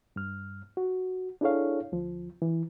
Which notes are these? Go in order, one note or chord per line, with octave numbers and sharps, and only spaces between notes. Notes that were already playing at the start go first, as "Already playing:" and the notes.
G2 F6
F#4
D4 E4 G#4 A4 C#5 F5
D2 F3
E3